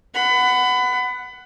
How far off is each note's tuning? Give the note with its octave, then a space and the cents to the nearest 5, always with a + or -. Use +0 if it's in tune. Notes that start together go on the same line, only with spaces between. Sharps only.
F#5 +0 B5 +25